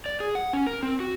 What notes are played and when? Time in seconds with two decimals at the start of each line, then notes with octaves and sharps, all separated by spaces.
0.06 D5
0.20 G#4
0.35 F#5
0.53 C#4
0.67 A#4
0.83 C4
1.00 F#4